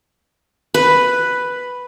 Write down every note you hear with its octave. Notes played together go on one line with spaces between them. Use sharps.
B4